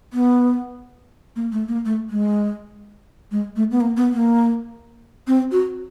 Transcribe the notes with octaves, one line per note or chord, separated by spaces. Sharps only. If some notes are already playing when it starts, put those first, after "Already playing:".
B3
A#3
A3
A#3
A3
G#3
G#3
A3
B3
A#3
B3
A#3
C4
F#4